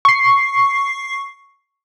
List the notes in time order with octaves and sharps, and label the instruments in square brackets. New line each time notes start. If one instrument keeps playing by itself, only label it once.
[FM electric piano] C#6 C7